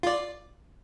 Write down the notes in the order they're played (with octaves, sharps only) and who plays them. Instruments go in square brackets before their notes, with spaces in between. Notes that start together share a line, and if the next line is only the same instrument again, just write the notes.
[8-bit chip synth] F4 D5